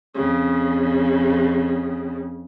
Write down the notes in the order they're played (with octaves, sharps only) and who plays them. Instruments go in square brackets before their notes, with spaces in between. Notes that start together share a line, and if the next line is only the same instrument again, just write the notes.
[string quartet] F2 C#3